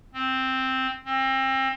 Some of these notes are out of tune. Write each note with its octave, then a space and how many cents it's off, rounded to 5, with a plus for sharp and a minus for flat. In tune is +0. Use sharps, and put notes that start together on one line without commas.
C4 +0
C4 +30